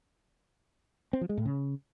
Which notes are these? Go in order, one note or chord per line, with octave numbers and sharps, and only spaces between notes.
C4
F3
G#3
A2
C#3